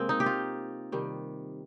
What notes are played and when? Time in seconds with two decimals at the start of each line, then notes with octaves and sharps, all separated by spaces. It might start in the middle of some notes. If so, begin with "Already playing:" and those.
Already playing: C3 G#3 A#3 C4
0.09 D#4
0.20 G4
0.26 F4
0.92 C3 D#3 G3